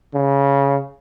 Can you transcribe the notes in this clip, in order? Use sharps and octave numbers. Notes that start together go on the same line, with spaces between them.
C#3